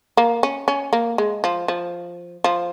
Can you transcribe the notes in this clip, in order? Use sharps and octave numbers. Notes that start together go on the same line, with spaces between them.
A#3
C#4
C#4
A#3
G#3
F3
F3
F3